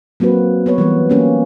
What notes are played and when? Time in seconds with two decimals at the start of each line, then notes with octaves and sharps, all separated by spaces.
0.20 F#3 A#3 C4 F#4 B4
0.66 B3 B4 C#5
0.78 E3 G3 B3
1.10 A#3 C#4 G4